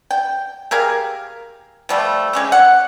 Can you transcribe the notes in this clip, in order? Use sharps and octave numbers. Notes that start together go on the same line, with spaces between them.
G5
G4 G#4 A#4 F5
F3 G3 A3
G#3 C#4 G4
F#5